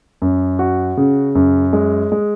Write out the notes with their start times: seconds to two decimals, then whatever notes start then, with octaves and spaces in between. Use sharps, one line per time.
0.22 F#2
0.59 F#4
0.97 C#3
1.35 F#2
1.73 G#3
2.12 G#3